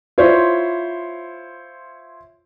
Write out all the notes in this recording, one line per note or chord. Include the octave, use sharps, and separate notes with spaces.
E4 F4 C5 C#5